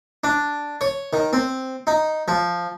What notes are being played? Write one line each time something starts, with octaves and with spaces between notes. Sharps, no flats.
D4
C#5
D#3
C4
D#4
F3